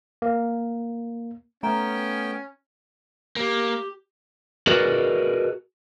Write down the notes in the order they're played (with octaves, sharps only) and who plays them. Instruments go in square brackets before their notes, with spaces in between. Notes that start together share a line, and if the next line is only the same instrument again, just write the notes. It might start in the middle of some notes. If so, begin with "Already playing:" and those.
[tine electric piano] A#3
[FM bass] A3 [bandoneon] B3 G5 [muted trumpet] C#4 [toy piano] A#5
[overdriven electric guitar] A#3 [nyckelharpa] G4
[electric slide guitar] F#4 G#4 A#4 B4 D5 D#5